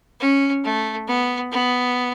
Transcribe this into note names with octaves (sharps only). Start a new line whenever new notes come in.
C#4
A3
B3
B3